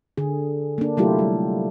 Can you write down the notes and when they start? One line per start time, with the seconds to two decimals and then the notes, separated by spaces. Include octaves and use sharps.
0.18 D3 G#4
0.78 A#3 D4
0.97 C3 F#3 A3 E4 F4 G4
1.19 G3